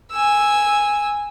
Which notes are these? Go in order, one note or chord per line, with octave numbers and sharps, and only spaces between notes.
G#5 E6